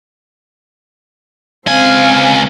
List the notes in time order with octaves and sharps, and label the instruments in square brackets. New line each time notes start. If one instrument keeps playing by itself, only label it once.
[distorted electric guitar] C#2 G#5 [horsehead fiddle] C4 F5